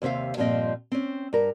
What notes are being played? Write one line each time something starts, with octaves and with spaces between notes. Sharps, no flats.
D#2 C3 C5 E5 F5
G2 A#2 F3 F#3 C4 D#5
C4 C#4
G2 A#4